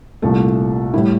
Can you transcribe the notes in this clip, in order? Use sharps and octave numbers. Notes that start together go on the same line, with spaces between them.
C2 A#2 A3 A4
A2 G3 E4